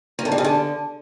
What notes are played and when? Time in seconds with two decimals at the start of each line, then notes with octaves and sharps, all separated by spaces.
0.19 A#3
0.25 D3
0.32 G3
0.38 C#3
0.44 D3